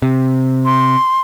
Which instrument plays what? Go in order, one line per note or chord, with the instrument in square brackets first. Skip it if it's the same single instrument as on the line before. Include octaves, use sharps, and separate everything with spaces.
[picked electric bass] C3
[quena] C6